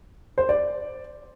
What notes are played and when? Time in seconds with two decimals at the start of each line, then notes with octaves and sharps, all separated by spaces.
0.38 C5
0.49 D5